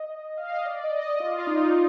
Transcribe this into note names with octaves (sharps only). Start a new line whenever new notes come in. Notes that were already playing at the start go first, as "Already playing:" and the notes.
Already playing: D#5
F5
D#5
D5
D#5
D#5
F4
F4
D#4
F4